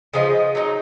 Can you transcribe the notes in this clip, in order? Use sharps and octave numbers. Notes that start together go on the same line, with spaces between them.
C#3 F3 B3 D#4 G#4
F#3 A#3 D#4